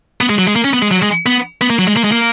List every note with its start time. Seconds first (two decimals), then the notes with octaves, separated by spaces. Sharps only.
0.21 B3
0.30 G#3
0.38 F#3
0.47 G#3
0.56 A#3
0.64 C#4
0.73 B3
0.82 G#3
0.91 F#3
1.02 G#3
1.26 B3
1.61 B3
1.70 A#3
1.79 F#3
1.87 G#3
1.96 A#3
2.04 G#3
2.12 A#3